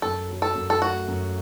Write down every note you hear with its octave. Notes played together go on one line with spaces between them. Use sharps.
F#2 A4
F#3
A4
F#2
A4
A3 F#4
F#2